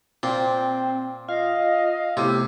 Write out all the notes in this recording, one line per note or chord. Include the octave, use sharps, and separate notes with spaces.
A#2 C4 G5
F4 D#5 F5
A2 C3 B3 E4 D6 E6